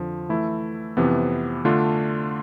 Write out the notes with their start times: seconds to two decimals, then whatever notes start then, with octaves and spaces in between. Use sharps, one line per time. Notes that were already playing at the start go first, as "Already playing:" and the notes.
Already playing: F2 D3 F3
0.29 E3 A3 E4
0.97 F2 C3 E3 B3
1.65 D3 A3 D4 F4